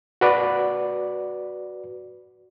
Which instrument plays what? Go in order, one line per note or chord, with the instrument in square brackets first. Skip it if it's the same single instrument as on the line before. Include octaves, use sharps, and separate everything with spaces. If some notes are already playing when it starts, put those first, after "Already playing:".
[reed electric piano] F#4 B4 D5